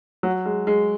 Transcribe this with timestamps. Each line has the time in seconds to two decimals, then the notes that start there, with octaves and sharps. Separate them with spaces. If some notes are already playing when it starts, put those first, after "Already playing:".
0.23 F#3
0.45 G#3
0.67 G#3